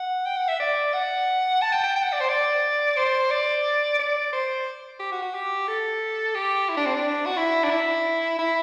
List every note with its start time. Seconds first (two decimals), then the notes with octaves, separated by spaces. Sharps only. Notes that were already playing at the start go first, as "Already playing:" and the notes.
Already playing: F#5
0.26 G5
0.37 F#5
0.49 E5
0.60 D5
0.94 F#5
1.62 A5
1.73 G5
1.84 G5
1.96 G5
2.03 F#5
2.13 D5
2.20 C5
2.29 D5
2.97 C5
3.31 D5
3.99 D5
4.33 C5
5.00 G4
5.12 F#4
5.22 F#4
5.34 G4
5.68 A4
6.35 G4
6.69 E4
6.77 D4
6.86 C4
6.95 D4
7.26 F#4
7.37 E4
7.64 D4
7.71 E4
8.39 E4